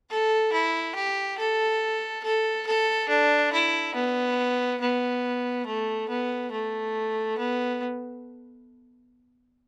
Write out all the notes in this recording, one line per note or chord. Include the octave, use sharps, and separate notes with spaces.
A4
E4
G4
A4
A4
A4
D4
E4
B3
B3
A3
B3
A3
B3